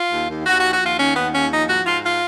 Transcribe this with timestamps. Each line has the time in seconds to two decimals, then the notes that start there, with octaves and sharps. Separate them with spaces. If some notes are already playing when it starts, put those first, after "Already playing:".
Already playing: F4
0.11 D#2
0.29 D#2
0.46 D#2 F#4
0.59 F#4
0.64 F3
0.72 F#4
0.81 D#2 F4
0.98 D#3 C#4
1.16 D#2 B3
1.34 D#2 C#4
1.52 F3 D#4
1.69 G#2 F#4
1.86 G#2 F4
2.04 F4